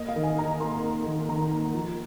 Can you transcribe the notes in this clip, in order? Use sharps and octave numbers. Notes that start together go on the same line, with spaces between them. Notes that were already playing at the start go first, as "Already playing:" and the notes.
Already playing: A#3 D#5
F5
D#3
G#5
D#4 A#5
A#3 C6
A#3
D#3
D#3 A#5
A#3
F3